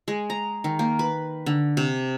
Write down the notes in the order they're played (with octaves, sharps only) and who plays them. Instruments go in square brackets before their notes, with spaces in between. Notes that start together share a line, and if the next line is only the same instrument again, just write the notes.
[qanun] G#3
A#5
D#3
A#3
B4
D3
C3